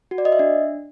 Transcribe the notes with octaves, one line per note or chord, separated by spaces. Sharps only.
F#4
D5
D#5
E5
D4